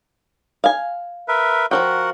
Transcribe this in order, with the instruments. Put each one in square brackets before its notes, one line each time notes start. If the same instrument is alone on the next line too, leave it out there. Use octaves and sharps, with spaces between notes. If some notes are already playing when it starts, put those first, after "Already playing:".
[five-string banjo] F5 G#5
[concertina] A#4 B4 E5
[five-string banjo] F3 F#3 G5 [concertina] F#4 A#4 F#5